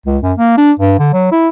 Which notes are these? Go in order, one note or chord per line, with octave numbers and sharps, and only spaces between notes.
C#2
F#2
A#3
D4
G2
D3
F#3
E4